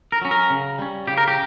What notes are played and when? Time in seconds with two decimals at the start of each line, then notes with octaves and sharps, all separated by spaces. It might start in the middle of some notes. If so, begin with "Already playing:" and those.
0.12 A#4
0.22 F#3 C#4
0.31 A#4
0.50 C#3
0.79 G3 C#4
1.08 C#3 G4
1.18 A#4
1.28 G4